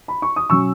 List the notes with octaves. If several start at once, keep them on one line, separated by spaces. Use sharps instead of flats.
B5
C#6
D#6
B2 F#3 C#4 C#6 E6